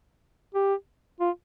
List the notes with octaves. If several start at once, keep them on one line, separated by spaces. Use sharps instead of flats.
G4
F4